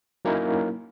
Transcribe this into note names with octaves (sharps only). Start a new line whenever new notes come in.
F#3 A#3 C#4 D#4 E4 A#4